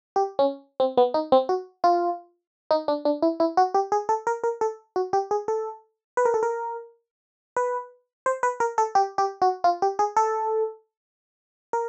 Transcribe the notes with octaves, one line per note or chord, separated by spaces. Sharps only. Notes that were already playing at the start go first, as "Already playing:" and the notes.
G4
C#4
C4
B3
D#4
C4
F#4
F4
D#4
D4
D4
E4
E4
F#4
G4
G#4
A4
A#4
A#4
A4
F#4
G4
G#4
A4
B4
A#4
A4
A#4
B4
C5
B4
A#4
A4
G4
G4
F#4
F4
G4
G#4
A4
A#4